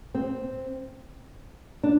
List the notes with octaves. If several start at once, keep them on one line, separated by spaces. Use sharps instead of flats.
C4
D4